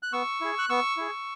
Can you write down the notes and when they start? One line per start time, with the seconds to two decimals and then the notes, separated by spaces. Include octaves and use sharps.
0.03 F#6
0.13 B3 C#6 E6
0.41 E4 G#4
0.59 F#6
0.69 B3 C#6 E6
0.97 E4 G#4